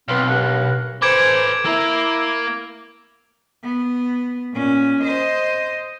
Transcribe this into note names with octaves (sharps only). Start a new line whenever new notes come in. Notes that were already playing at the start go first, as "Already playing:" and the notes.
B1 B3 C4 F4
G2 A#4 F#5
A4 B4 C5 G#5 D6 G#6 D7
A#3 E4 A#4
B3
A#2 C#4
C5 D#5